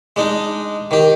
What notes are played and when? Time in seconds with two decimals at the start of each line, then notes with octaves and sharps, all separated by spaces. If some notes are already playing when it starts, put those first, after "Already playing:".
0.16 G#3 D4 D#4
0.91 D#3 G4